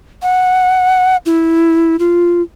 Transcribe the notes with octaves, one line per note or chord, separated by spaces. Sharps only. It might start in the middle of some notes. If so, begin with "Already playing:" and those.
F#5
E4
F4